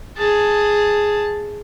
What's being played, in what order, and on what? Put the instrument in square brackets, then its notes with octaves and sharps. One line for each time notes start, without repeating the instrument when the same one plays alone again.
[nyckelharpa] G#4 A5